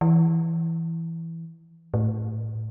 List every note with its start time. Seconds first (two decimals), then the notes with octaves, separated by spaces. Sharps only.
0.01 E3
1.94 A2